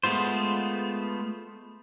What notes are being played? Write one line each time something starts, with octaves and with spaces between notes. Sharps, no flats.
G#3 A3 B3 F4 C5